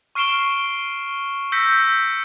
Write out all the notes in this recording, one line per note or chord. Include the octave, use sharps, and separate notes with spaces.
C#6 F6 C7 D7 E7 G7
E6 G6 A#6 B6 C#7